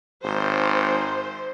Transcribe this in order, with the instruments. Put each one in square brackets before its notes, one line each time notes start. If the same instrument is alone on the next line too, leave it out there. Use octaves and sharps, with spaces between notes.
[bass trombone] G#1 [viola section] C5